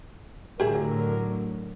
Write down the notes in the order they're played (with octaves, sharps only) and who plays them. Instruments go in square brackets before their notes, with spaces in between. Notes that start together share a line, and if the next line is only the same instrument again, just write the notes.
[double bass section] A2 D3 F#3 [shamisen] G4 G#4 E5 [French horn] A#4